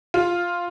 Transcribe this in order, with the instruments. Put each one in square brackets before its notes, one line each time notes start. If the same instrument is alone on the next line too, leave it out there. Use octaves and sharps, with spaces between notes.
[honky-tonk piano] F4